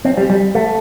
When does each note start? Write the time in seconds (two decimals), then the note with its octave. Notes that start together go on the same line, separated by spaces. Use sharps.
0.05 C4
0.17 G3
0.30 G3
0.55 A3